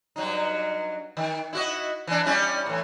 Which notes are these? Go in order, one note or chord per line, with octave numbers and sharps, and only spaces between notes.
G2 F#3 D#4
D#3
E4 F#4 D#5
E3 D4
G3 C#4 E4
A2 E3